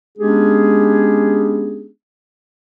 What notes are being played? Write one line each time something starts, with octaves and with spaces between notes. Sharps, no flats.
G#3 B3 C#4 D4 G4 G#4